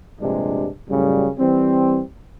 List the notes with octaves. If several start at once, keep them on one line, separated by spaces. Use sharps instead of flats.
A#1 G2 C3 G#3 D4
F#2 A2 C#3 G3
E3 G3 C4